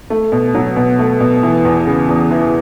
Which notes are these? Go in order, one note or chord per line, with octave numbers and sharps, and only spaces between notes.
A3
B2
F#3
B2
A3
B2
E3
E2
C#3
E2
E3